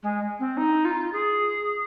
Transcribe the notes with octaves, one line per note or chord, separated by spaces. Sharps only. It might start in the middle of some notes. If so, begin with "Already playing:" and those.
G#3
C4
D#4
F4
G#4